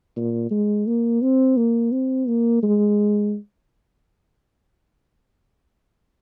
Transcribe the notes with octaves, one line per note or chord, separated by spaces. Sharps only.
A#2
G#3
A#3
C4
A#3
C4
A#3
G#3